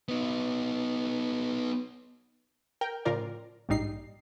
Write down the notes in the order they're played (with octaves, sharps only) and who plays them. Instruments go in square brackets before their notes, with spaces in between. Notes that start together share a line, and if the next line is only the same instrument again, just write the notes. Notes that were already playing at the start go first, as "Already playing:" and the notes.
[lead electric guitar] B3 D#4
[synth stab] A#4 G5
A2 C#3 F3 F4 A#4 D5
A#1 G#2 G3 D#4 C7